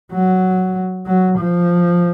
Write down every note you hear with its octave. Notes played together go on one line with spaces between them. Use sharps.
F#3
F#3
F3